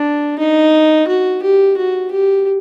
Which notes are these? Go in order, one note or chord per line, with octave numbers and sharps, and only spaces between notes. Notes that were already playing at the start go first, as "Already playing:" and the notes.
Already playing: D4
D#4
F#4
G4
F#4
G4